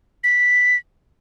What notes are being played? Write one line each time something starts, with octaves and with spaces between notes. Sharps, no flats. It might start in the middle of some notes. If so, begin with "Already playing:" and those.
B6